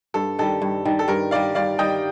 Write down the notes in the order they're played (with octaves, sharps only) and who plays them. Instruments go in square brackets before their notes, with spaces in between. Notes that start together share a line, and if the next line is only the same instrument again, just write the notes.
[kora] G2 [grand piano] A4
[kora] D#3 G3 [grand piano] A4
[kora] G2
D#3 G3
[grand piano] A4
[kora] G2 [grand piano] A#4
[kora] D#3 G3 [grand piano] D5 F5
[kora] G2 [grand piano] D5 F5
[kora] D#3 G3 [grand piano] D#5 G5